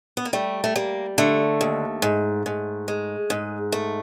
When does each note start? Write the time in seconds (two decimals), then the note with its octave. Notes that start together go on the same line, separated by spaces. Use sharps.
0.17 B3
0.25 A#3
0.33 G3 A3
0.64 A3
0.76 G3 A#3
1.18 D3 A3
1.61 D#2
2.02 G#2
2.46 G#2
2.88 G#3
3.30 G#2
3.72 A3